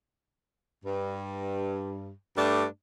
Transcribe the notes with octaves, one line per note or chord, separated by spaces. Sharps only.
G2
G2 A3 D4 D5